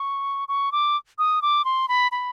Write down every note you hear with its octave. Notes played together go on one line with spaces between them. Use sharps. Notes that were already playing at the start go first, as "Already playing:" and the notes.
Already playing: C#6
C#6
D6
D#6
D6
C6
B5
B5